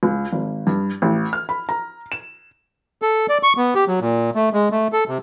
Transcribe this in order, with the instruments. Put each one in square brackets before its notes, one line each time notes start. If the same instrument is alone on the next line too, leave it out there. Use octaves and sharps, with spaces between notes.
[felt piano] C#2
G#1
G2
A1
F6
B5
A#5
E7
[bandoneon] A4
D5
C#6
B3
G4
F#3
A#2
A3
G#3
A3
A4
C3